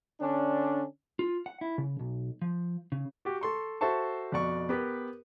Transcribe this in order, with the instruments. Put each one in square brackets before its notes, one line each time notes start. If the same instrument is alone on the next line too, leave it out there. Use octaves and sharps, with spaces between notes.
[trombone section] D3 C#4 D4
[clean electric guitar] F4
F#5
E4
C#3
B1
F3
C#3
[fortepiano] F#4 G4
A4 C6 C#6
F#4 A4 C5 E5 A5 C#6
F2 B2 D5 C#6
B3 G4 A#4 B4